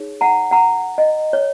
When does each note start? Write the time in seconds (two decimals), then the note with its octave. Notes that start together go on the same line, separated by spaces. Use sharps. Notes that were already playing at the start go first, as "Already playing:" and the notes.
Already playing: D#4 G#4 C#5
0.21 F#5 A#5
0.51 F#5 A#5
0.98 D#5
1.33 C#5